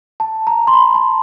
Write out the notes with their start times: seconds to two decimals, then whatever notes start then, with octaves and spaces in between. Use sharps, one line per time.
0.20 A5
0.47 A#5
0.67 C6
0.74 B5
0.94 A5